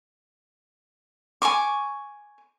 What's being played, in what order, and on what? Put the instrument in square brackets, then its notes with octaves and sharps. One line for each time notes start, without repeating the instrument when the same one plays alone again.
[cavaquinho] G#5 A5 C#6 D6